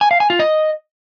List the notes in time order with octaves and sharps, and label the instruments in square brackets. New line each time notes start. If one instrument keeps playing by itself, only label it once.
[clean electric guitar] G#5
F5
G#5
F4
D#5